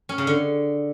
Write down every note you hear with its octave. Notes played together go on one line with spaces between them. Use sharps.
C#4
C#3
D3